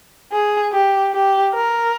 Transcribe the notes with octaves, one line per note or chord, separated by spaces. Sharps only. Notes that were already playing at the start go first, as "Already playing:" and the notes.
G#4
G4
G4
A#4